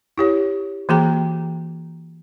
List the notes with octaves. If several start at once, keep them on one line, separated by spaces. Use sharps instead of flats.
E4 G4 C#5
E3 A#3 F#4 G#4 G5 A#5